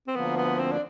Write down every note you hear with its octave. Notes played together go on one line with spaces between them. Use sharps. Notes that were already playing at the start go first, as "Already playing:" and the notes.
C4
D2 D3 F3 A#3 B3
B3
C4
D4